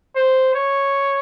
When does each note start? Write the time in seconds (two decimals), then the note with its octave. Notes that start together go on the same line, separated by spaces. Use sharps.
0.16 C5
0.55 C#5